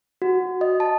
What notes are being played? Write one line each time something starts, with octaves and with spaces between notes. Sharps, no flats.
F#4
D#5
A5